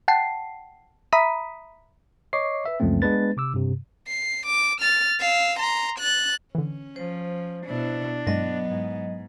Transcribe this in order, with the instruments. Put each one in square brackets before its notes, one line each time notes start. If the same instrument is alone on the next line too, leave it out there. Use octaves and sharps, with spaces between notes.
[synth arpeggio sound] F#5 G5 A5 C7
E5 A#5 B5 D#6 B6 D#7
[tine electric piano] C#5 D#5 C#6 D6 C7
B4 E5
C#2 F#2 F3 A3 C4
G#3 B3 D4 B4 A6
C3 D6 E6
G2 C3
[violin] C7
D6
F6 A6
F5 E6
A#5 C6
F#6 A6
[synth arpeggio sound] D3 E3 [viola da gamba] C#4
[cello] F3 [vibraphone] C5
[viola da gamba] B2 E4 [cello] D4
[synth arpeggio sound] G2 G#3 [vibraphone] F#3 D#5 [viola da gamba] B3
[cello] G#2